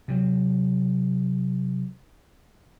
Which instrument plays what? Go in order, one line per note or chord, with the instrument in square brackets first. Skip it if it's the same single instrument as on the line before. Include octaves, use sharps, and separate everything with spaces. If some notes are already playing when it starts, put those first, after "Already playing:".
[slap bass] C3 F#3